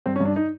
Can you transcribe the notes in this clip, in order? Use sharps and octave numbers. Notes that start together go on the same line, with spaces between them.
G2 C4
C#4
G2
D4
D#4